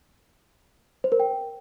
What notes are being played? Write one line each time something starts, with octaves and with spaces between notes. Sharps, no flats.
C5
A#4
G5